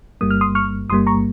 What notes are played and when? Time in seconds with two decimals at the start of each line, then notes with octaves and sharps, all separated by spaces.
0.21 G1 G2 G3 A#3 D#6
0.31 F6
0.41 C6 D#6
0.55 C#6 F6
0.90 G1 G2 G3 A#3 C6 D#6
1.07 A#5 C#6